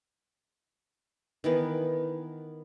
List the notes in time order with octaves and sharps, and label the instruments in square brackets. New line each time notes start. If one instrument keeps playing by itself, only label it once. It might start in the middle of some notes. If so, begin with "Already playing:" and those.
[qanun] D#3 E3 B3